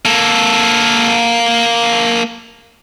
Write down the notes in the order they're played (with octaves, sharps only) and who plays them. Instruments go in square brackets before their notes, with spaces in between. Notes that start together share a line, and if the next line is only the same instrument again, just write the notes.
[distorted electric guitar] A#3 A4